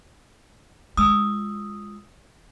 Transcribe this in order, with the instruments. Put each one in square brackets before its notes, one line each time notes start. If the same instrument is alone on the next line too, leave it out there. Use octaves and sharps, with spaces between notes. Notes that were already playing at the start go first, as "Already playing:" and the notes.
[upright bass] G#3 F4 [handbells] D#6 E6